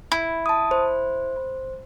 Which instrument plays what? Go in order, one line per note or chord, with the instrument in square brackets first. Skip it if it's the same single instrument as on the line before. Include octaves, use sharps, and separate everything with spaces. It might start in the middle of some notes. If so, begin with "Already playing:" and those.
[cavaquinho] E4
[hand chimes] A5 D#6
C5